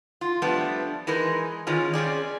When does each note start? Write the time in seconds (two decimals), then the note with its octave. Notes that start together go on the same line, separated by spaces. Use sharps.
0.21 F4
0.42 F3 G3 A3 B3 D4
1.07 E3 G#3 D#4 A#4 B4
1.67 D#3 E3 G#3 C#4 F4
1.93 C4 C#4 G#4 D5